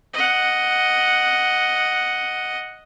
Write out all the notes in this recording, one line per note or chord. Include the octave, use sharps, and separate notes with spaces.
D#5 F#5